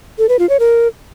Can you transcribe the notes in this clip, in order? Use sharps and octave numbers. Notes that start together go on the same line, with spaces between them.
A4
B4
F4
C#5
A#4